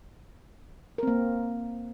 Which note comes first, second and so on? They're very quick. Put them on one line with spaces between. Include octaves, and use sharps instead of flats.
A#4 C4 A#3